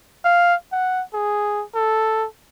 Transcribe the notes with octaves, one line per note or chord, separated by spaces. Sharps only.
F5
F#5
G#4
A4